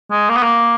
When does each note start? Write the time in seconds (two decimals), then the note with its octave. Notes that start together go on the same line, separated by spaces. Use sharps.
0.11 G#3
0.29 A#3
0.36 B3
0.42 A#3